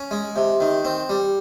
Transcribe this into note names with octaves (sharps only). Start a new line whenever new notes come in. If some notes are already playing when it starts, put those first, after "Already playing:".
Already playing: C#4
G#3
C3
D#3
C4
G3